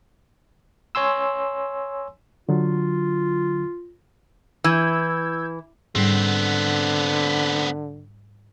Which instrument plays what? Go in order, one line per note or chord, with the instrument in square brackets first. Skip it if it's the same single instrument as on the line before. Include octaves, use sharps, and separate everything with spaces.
[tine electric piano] C#5 G#5 C6 E6
[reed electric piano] D3 F#3 [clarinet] F4
[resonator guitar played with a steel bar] E3 [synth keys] E6 G6 G#6
[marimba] G#2 G3 [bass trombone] D3 [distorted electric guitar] B3 C4